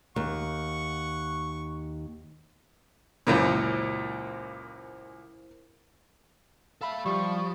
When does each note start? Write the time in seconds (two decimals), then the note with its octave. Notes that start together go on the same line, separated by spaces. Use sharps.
0.16 D#2 F#5 C#6
3.27 C#2 F#2 A#2 E4 A#4 C5
6.81 A4 E5 F5 B5
7.06 F3 G3 C#6